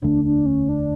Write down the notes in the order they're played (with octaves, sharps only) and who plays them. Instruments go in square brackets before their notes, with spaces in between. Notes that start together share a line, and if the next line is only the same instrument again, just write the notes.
[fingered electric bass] E1 D2 D3 A3 [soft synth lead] D4
[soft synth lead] D4
C#4
D4